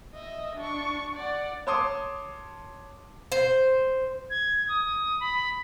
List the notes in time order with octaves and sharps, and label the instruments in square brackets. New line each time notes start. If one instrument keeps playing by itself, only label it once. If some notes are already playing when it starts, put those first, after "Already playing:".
[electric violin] D#5 E5
D4 C#6
D5 F#5
[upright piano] C#5 A5 C6 D6 D#6
[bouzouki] C5
[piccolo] G#6
D#6
B5